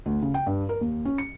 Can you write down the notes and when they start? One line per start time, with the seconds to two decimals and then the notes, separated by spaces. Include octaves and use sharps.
0.06 D2
0.22 C#3
0.34 G5
0.46 G2
0.69 A#4
0.81 D#2
1.05 C#4
1.18 C#7